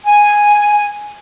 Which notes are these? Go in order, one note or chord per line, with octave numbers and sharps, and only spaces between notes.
G#5